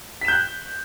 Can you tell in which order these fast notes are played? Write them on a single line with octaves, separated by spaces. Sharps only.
B6 E7 G6 F#6